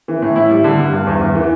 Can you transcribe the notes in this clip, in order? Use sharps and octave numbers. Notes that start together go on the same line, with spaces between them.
E3
A2
E4
G3
D3
G2
G2
E2
E2
E3